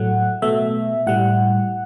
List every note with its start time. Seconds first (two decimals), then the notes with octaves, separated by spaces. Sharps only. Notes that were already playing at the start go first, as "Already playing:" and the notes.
Already playing: A2 F#3 A3 F#5
0.42 B2 A3 E5
1.07 A2 G3 F#5